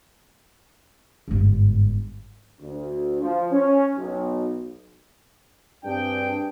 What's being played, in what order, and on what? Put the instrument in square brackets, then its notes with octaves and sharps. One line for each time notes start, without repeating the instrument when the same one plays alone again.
[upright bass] G1 G#2
[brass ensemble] D2
F3
C#4
B1
G2 C4 D4 G#4 G5